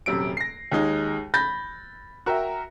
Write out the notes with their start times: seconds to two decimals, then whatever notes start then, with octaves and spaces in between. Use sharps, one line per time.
0.06 D#1 F#2 C3 D7
0.37 A#6 C7
0.72 D#2 G#3 D#4
1.34 B5 G6 A6 A#6
2.26 F#4 A#4 E5 G5